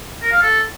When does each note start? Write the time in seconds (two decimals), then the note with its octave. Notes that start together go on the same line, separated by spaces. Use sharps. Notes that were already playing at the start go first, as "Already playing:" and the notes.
0.22 A#4
0.32 F5
0.42 A4